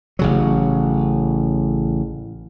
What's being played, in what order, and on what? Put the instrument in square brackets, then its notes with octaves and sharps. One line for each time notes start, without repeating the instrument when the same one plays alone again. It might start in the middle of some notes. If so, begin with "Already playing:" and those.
[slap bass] A1 C#3 F#3